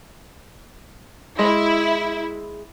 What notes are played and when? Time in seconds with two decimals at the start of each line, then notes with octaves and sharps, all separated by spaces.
1.39 G#3 E4